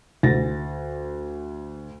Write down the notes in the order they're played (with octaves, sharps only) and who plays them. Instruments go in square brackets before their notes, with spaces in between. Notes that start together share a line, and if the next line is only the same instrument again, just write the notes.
[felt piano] D2 A6 A#6